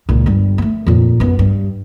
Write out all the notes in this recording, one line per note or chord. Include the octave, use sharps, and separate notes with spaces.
C#2 A#2
G1 G3
A3 B3
F2 A#2
F#2 B3
G2